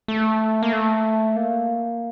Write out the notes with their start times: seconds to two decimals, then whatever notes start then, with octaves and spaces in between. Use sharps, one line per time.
0.08 A3
0.63 A#3
0.73 A3
1.36 A#3